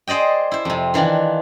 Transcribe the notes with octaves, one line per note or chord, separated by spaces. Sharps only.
G#4 C5 D5 D#5 G5
E4 C5
F2 C3
D#3 E3 D4 F4